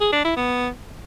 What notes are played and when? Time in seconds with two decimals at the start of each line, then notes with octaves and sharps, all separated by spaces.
0.01 G#4
0.13 D4
0.25 E4
0.36 B3